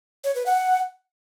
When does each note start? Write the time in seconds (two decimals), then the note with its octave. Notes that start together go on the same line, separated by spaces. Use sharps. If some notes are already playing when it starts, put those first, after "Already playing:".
0.24 C#5
0.35 B4
0.46 F#5